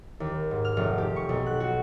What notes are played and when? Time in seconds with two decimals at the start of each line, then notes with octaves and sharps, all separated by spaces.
0.20 D#2
0.51 G#2
0.65 F6
0.77 F1
0.98 G4
1.16 C#6
1.29 B1
1.46 F#6
1.60 F#4